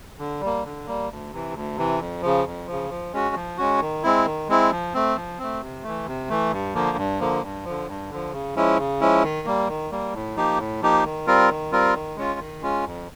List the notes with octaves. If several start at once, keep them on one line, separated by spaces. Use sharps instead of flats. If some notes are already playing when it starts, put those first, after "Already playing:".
D3
G3
A#3
D3
G3 A#3
D2
C3 E3
D2
C3 E3
F2
C#3 F3
F2
C#3 F3
F3
G#3 C#4 F#4
F3
G#3 C#4 F#4
D#3
G#3 C4 E4
D#3
G#3 C4 E4
F3
A3 C4
F3
A3 C4
C3
E3 A3
C3
E3 A3
G2
D3 F3 A#3
G2
D3 F3 A#3
G2
D3 F3
G2
D3 F3
C#3
F3 G#3 C#4 E4
C#3
F3 G#3 C#4 E4
D#3
G3 A#3
D#3
G3 A#3
A2
F3 A#3 D#4 G4
A2
F3 A#3 D#4 G4
D#3
G3 C4 F4 A#4
D#3
G3 C4 F4 A#4
D#3
G#3 C#4 F4
D#3
G#3 C#4 F4
F2